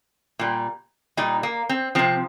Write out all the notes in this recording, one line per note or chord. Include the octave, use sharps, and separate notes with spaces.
A#2 G3
A#2 G3 D#4
A#3
C4
C3 F3 C4